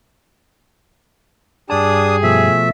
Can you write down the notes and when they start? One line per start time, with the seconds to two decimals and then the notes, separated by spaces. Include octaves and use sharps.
1.70 G2 D4 G4 G#4 A5 D#6
2.23 B2 F3 A3 E5